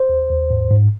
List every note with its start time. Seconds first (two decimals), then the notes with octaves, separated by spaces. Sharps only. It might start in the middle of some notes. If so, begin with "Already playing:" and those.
Already playing: C5
0.09 D#2
0.30 D#2
0.51 G#2
0.71 G#2